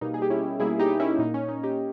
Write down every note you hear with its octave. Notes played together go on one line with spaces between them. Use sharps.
B2 G3 A#3 D#4
G#4
G4
C#4 E4
B2 G3 A#3 E4 G#4
D#4 G4
C#4 E4
A#2 A#3 D#4
C#4
D#4
D#4 G4